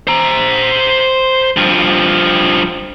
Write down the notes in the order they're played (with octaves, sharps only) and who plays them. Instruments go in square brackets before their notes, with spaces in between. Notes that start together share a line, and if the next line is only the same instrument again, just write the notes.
[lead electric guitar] C5 A#5
G2 F3